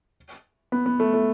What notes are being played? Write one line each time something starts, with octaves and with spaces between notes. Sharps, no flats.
B3
B3
A3
A3